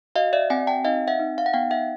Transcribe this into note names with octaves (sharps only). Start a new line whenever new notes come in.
F#4 D#5 F5
D5 E5
C4 F#5 G#5
G5 A5
D#4 D#5 F5
E5 F#5
D#4
F5
F#5
B3 F5 G5
E5 F#5